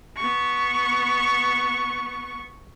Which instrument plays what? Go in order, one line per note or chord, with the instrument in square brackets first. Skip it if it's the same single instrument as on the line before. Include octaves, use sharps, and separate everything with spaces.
[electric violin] B3 C#6